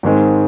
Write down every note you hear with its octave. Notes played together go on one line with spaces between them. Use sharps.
G#2 D#3 G#3 C4